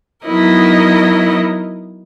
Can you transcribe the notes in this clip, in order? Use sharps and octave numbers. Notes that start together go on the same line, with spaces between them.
F#3 B3 D#4 E4 A#4 D#5